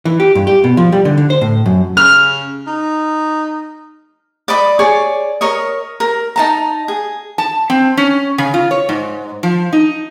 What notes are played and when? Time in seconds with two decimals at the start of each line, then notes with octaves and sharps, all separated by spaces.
0.05 E3
0.20 G4
0.35 G2
0.47 G4
0.64 B2
0.77 F3
0.92 G3
1.05 D3
1.18 D3
1.30 C5
1.41 A2
1.66 F#2
1.97 C#3 F6
2.67 D#4
4.48 D5 D#5 B5
4.79 G#4 C#5 D5 D6
5.41 A#4 C#5 D#5
6.00 A#4
6.36 D#4 A5 A#5
6.88 G#4
7.38 A5
7.70 C4
7.97 C#4
8.38 C#3
8.54 F4
8.71 C#5
8.89 G#2
9.43 F3
9.73 D#4